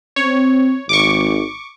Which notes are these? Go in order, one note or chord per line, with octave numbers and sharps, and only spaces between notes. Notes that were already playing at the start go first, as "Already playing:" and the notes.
C4 C#5
G#1 C#6 D6